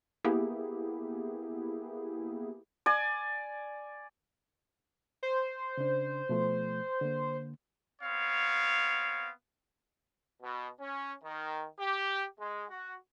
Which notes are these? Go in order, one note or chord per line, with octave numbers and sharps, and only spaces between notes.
A#3 B3 E4 G4 G#4
D5 G#5
C5
C#3 D4
B2 F3 A3
D3 A#3
B3 C4 C#5 F5
B2
C#4
D#3
G4
G#3
F#4